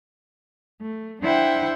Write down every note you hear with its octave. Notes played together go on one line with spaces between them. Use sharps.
A3
D4 E4 C5 E5 F#5 G5